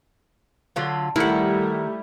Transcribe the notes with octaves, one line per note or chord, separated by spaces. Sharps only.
D3 F#3 F4
D#3 G3 A3 E4 F#5